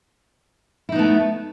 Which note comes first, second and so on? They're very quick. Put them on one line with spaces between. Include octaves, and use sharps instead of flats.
E4 D#4 B3 A3